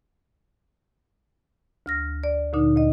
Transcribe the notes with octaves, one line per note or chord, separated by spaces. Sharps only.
D2 F6 A#6
D5
D2 A#2 D3 D#4
D2 D#5